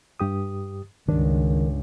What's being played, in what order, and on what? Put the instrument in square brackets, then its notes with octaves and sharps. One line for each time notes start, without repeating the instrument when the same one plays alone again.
[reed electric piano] G2 G4 D#6
[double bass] C#2 [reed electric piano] G2 D4 [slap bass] D#3